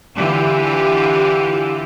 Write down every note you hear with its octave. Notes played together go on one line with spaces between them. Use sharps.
D3 E3 F4 G4